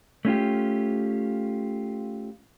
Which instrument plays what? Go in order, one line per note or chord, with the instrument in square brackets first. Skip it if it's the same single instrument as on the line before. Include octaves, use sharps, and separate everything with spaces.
[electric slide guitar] A3 C#4 F4 G4